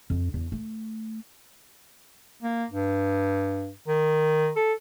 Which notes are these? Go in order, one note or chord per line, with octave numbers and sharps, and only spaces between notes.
F2
E2
A3
A#3
G2
D#3
A4